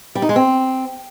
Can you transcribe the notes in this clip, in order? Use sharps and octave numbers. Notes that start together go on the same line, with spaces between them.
G3
D#4
G#3
C4